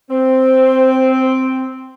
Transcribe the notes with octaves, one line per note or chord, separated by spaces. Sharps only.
C4 C5